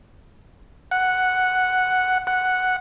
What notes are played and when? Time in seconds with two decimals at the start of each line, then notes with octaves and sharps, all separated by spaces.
0.91 F#5
2.27 F#5